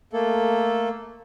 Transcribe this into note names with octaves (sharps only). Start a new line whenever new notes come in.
A3 A#3 A4